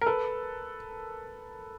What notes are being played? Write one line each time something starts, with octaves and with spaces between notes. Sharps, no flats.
A#4
A4 B4